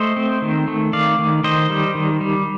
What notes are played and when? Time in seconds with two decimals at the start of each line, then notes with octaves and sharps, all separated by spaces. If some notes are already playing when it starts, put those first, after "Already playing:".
Already playing: A3 C5 D#5
0.17 C4
0.42 D#3
0.68 A3
0.93 D#3 D5 F5
1.19 D#3
1.44 D#3 C5 D#5
1.70 G3
1.95 D#3
2.21 G3